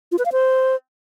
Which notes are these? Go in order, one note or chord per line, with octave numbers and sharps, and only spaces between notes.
F4
B4
F5
C5